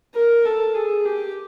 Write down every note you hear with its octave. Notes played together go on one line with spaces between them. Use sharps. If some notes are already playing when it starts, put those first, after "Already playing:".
A#4
A4
G#4
G4